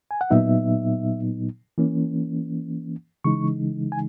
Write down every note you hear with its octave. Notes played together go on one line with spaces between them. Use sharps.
G#5
F#5
A#2 F#3 B3 D#4 E5
E3 A#3 C#4
C#3 E3 G#3 D#4 C#6
G#5